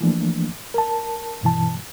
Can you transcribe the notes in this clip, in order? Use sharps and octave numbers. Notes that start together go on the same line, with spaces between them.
E3 F3 A3 A#3 D4
A#4 A5
G2 B2 E3 A5